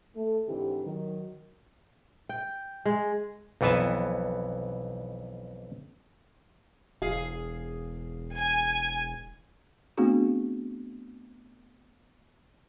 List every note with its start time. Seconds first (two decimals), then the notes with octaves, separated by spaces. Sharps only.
0.16 A3
0.48 G#2 D3 E3 C4 G4
0.85 D#3 F#3
2.29 G5
2.85 G#3
3.61 B1 F2 E3 B3 G#5 A5
7.02 E1 G#4 F5
8.35 G#5
9.97 A3 B3 C4 D4 F#4 G#4